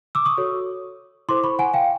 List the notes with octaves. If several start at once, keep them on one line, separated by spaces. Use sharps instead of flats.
D6 E6
C#6 D#6
F#4 A4 C#5
E4 A4 C5 C6 D6
B5 C#6
F#5 G#5
F5 G5